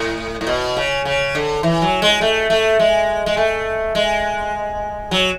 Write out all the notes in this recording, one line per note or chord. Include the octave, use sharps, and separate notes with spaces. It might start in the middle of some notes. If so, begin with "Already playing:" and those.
Already playing: A2
A2
B2
C#3
C#3
D3
E3
F#3
G#3
A3
A3
G#3
G#3
A3
G#3
F#3